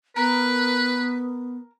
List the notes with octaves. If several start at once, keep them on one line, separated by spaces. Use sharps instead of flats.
B3 A#4 B4